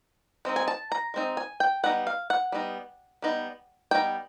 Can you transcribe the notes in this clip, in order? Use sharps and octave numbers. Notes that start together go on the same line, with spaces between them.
G#3 C4 D#4
G#5
A5
A#5
G#3 C4 D#4
G#5
G5
G3 B3 D#4 F#5
F5
F#5
G3 B3 D#4
G3 B3 D#4
G3 B3 D#4 G5